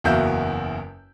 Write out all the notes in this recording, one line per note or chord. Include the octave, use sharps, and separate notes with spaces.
F#1 E2 A#3 F#4 E5 G6